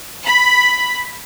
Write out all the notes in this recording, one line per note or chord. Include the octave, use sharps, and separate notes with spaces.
B5